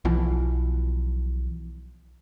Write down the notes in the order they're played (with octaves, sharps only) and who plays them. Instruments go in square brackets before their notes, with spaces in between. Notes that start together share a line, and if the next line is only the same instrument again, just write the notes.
[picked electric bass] B1 B2 E3 F3